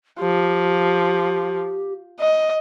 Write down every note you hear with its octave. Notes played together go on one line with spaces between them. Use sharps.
F3 G4
D#5